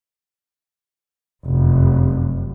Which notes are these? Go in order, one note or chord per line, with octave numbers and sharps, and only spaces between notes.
F1 F#2